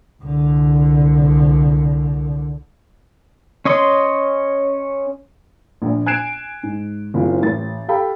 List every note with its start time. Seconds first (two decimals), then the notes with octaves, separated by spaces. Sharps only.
0.22 C2 D3
3.65 C#4 C#5 D#5 C6
5.82 A#1 A#2
6.06 G#5 F#6 G#6 C7 D7 E7
6.63 G#2
7.14 F#1 C4 F4
7.42 A1 A6
7.88 G4 A4 F5 G5 B5